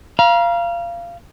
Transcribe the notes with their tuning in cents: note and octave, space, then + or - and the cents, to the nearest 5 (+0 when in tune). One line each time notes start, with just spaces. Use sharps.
F5 -20 A#5 +35